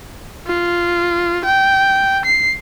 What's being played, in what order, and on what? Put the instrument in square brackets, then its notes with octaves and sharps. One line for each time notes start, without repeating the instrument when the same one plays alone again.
[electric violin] F4
G5
C7